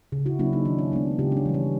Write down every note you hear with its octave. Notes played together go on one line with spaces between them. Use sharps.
C#3
E4 F#4
F#3 A#3 C#4 D4 E4
C#4 D#4
D#3 D4
C#4
G#3 B3 D4
C#3 F4 G4
C#4
D4
E3 G3
C#4